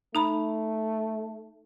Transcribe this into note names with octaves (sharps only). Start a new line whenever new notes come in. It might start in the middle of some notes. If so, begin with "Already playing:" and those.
A3 D#4 A#5 B5